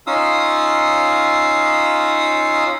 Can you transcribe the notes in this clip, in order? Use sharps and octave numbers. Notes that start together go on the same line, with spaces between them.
C#4 D#4 F4 F5 D#6 E6